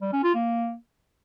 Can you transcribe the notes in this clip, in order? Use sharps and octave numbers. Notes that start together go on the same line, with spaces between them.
G3
C#4
F4
A#3